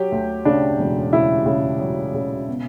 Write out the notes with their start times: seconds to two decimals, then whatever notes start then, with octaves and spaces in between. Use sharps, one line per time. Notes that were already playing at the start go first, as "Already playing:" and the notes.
Already playing: F#3 G4
0.12 D2
0.45 C#3 D4
0.79 E1
1.13 C#3 E4
1.46 C#3
1.80 F#3
2.14 C#3
2.48 B2